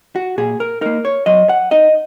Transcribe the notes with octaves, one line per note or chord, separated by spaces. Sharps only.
F#4
A#2 G#4
A#4
A#3 D#4 A#4
C#5
F#3 D#5
F#5
D#4 D#5